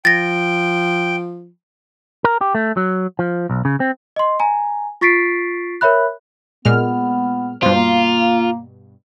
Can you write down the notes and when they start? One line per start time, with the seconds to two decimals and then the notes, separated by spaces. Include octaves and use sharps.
0.05 F3 G5 A6 A#6
2.24 A#4
2.41 G4
2.55 A3
2.77 F#3
3.19 F3
3.50 B1
3.65 C#3
3.80 C4
4.16 D#5 C6
4.40 G#5 A#5
5.01 F4 C#6 A6 B6 C7 D7
5.81 A#4 C#5 E5 B5 F#6
6.65 A#2 G#3 B3 F6
7.63 G2 B2 F4 C5
7.75 A#3